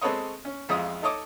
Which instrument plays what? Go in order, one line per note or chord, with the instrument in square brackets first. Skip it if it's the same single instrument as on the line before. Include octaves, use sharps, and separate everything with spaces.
[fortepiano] G#3 C4 A4 B4 C#5 D#5
C#4
A1 F2 G#3 F4 D#6
D#4 A4 C#5 D#5 D6